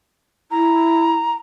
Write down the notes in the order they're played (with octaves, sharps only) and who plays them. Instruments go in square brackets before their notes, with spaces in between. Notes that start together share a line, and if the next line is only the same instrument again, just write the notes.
[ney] E4 [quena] A#5